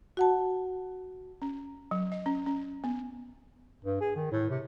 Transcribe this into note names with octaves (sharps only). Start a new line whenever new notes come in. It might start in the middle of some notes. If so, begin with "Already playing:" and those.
F#4 F#5 A5
C#4
F#3
D#5
C#4
C#4
B3
G2
G#4
D#3
A2
C3